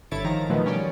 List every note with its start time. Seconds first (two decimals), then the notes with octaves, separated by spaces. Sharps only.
0.11 G1 D3 E4 C#5 A6 D7
0.24 D#3 F3 A#5 A#6
0.50 B2 D#3 F3 F#3 A3 B3
0.65 G3 C#4 G4 C#5 D5